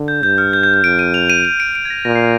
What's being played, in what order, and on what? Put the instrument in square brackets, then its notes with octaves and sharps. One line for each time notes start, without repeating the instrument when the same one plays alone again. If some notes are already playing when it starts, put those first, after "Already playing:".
Already playing: [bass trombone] D3
[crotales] G6
[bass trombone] G2 [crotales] G6
[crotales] F6
G6
G6
G6
[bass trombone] F2 [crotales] D7
[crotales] D#7
F7
D#7
D#7
D7
D7
G#6
A#6
[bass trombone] A#2 [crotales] A#6
[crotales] C7